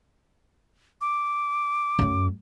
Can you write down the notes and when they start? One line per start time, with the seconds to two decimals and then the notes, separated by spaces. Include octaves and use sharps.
1.01 D6
1.99 F#2 A3